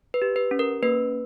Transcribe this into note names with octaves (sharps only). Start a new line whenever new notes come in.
B4
G4
B4
C#4
A#4
A#3 B4